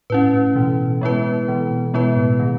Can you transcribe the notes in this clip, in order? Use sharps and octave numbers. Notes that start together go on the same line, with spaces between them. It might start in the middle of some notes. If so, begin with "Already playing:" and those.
A2 C#4 E4 B4
A2
B2 E3
G#3 B3 E4 B4
B2 E3
B2
B2 G#3 B3 E4 B4
A2
D#3